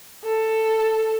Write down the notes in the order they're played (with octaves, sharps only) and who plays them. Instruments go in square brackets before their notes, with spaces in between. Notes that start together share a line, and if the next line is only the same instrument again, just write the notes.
[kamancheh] A4